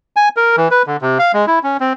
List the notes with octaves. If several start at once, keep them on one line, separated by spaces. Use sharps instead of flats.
G#5
A#4
E3
B4
D3
C3
F5
G#3
E4
C#4
C4